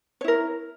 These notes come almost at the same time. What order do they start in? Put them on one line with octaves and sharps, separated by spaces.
C#5 E4 A#4